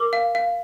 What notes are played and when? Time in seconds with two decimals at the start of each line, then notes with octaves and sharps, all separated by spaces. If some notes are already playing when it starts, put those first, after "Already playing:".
Already playing: A#4 D6
0.13 F5
0.35 F5